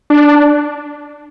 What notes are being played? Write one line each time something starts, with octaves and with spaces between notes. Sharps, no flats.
D4